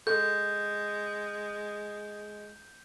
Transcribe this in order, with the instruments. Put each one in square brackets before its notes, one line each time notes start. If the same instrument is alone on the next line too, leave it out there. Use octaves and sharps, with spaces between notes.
[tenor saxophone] G#3 [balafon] A4 [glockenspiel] G6